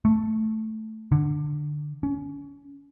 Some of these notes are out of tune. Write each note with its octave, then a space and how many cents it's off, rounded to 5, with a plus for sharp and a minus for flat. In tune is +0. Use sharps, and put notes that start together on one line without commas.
A3 -5
D3 +15
C#4 +25